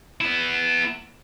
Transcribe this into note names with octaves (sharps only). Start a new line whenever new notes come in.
B3 E4